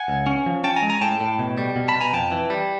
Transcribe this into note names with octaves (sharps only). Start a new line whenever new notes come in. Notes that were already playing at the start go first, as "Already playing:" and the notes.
Already playing: F#5 G#5
C#2
C#4
F3
C#4 G5 A5
G#5 A#5
G#3
G#5 A#5
A2 G5 A5
A2
B2
G3
B2
A5 B5
B2
G#5 A#5
F2 G5 A5
E3
G3